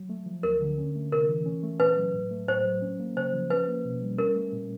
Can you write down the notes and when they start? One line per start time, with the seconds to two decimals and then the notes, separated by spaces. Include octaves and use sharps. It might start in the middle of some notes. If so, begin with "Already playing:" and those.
Already playing: F#3
0.09 A3
0.26 F3
0.43 D2 A#4
0.61 D3
0.78 C#4
0.95 A3
1.12 C3 A#4
1.28 E3
1.46 C#4
1.63 A3
1.80 A#2 B4
1.97 F#3
2.14 A2
2.31 A3
2.48 A2 C5
2.65 F#3
2.82 C#4
3.00 A#3
3.16 C#3 C5
3.34 F3
3.50 C#4 B4
3.68 A#3
3.85 B2
4.02 G3
4.18 C#4 A#4
4.36 A3
4.52 A#2